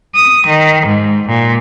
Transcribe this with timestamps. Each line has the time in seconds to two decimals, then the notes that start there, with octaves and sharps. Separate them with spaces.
0.15 D#6
0.48 D#3
0.87 G#2
1.27 A#2